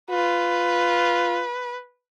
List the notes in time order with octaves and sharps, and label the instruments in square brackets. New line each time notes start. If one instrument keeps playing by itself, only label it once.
[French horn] F4 [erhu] B4